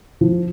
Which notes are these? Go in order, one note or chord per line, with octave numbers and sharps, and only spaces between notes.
F3